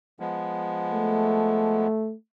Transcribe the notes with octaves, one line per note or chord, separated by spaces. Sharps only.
F3 G#3 B3
A3